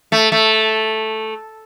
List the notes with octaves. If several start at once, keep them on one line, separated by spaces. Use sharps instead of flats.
A3
A3